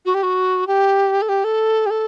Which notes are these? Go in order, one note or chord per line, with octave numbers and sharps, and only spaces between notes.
F#4
G4
F#4
G4
A4
G4
A4
G4
A4